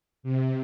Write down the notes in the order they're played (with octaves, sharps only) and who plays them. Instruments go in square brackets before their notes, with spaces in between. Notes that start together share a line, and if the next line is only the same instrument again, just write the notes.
[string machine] C3